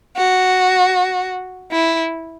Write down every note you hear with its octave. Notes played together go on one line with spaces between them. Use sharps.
F#4
E4